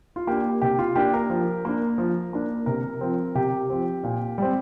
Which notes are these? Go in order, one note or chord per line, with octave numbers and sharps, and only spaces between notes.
F4
A#3 D4 G4
C3 G4
F4
A#3 D4 G4
A#4
F3
A#3 D4
F3
A#3 D4
C3 A#4
F3 C4
C3 G4
F3 C4
A#2
G3 C4